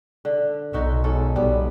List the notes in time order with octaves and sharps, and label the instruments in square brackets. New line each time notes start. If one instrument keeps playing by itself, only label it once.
[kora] D3
[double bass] B1 [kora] D#4 F#4 E5
[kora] G#2 C#4 A4
[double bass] B1 [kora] G3 B3